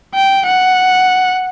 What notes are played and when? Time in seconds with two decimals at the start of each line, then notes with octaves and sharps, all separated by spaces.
0.15 G5
0.46 F#5